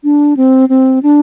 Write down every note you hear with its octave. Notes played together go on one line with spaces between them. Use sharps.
D4
C4
C4
D4